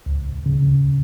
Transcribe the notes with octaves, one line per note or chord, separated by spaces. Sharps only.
C#2
C#3